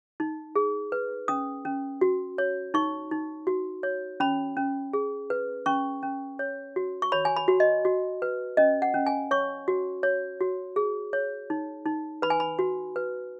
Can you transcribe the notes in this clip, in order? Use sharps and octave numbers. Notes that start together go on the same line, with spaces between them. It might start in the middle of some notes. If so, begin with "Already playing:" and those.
D#4
G#4
B4
C#4 D#6
C#4
F#4
C#5
D#4 C#6
D#4
F#4
C#5
C#4 B5
C#4
G#4
B4
C#4 C#6
C#4
C#5
F#4
C#6
C#5 B5
G#5
B5
F#4
D#5
F#4
B4
C#4 D#5
F#5
C#4
G#5
C#5 C#6
F#4
C#5
F#4
G#4
C#5
D#4
D#4
B4 B5
G#5
B5
F#4
B4